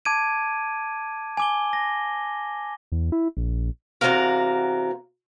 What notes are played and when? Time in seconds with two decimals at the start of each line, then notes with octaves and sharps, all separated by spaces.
0.05 A5 D6 G#6 D7 D#7
1.37 G#5 D6 G7
1.73 A#6
2.92 E2
3.12 E4
3.37 A#1
4.01 E2 C3 G#3 F#4 A#4 F5